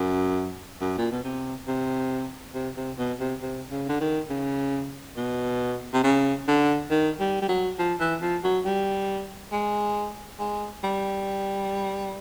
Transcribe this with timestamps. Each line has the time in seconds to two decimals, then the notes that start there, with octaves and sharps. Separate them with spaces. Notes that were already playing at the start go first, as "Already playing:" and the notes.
Already playing: F#2
0.81 F#2
0.98 A#2
1.11 B2
1.24 C3
1.68 C3
2.54 C3
2.77 C3
2.98 B2
3.20 C3
3.42 C3
3.70 C#3
3.89 D3
4.01 D#3
4.30 C#3
5.17 B2
5.93 C3
6.03 C#3
6.48 D3
6.90 D#3
7.20 G3
7.42 G3
7.48 F#3
7.79 F3
8.00 E3
8.21 F3
8.44 F#3
8.65 G3
9.52 G#3
10.39 G#3
10.84 G3